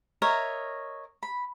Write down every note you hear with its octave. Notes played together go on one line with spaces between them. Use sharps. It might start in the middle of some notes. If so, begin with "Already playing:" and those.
A#4 C#5 D#5 E5
B5